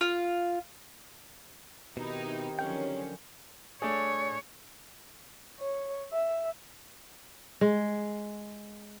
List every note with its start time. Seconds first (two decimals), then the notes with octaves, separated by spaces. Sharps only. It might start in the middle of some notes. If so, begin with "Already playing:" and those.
0.01 F4
1.97 B2 D#3 C4 D#4 E4 G4
2.59 D3 F3 F#3 C#4 A#4 G5
3.82 A3 D4 G#4 C#5
5.60 C#5
6.12 E5
7.61 G#3